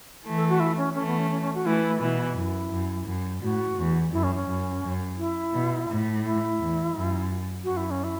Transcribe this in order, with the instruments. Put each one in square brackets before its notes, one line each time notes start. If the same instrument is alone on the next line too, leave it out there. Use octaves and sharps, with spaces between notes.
[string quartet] E3 A3
[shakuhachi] A4
F#4
E4
C#4
[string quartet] E3 A3 [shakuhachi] C#4
[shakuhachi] B3
C#4
C#4
C#4
F#4
[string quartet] E3 A3 [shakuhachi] E4
[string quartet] B2 E3
[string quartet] F#2 [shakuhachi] E4
[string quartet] F#2
F#2
[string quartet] A2 [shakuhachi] F#4
[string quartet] E2
[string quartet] F#2 [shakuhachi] E4
[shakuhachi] C#4
C#4
[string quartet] F#2
F#2
[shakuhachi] E4
[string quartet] B2
A2
[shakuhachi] E4
[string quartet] E2
F#2
[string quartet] F#2 [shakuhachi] F#4
[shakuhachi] E4
C#4
E4